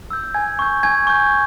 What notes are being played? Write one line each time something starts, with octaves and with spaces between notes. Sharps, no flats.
E6 G6
G#5 G#6
C#6 G6
G#5 G#6
C#6 G6